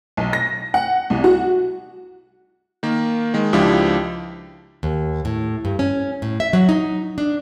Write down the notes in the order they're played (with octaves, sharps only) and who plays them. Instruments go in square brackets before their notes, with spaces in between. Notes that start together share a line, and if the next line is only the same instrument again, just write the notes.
[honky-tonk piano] B1
A#6
F#5
C2
F#4
[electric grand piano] D#3 A#3
D#3 G#3
C#2 F3 D4 E4 G4
[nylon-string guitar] D#2
A2
G2
C#4
A2
E5
F#3
D#4
D4